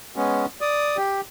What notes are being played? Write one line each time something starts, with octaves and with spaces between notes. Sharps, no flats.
G#3 B3 C#4
D5 D#6
G4